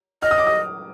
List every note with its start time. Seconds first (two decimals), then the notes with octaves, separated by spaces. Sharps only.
0.22 D#5 F6
0.31 D#6
0.38 D6
0.47 D#6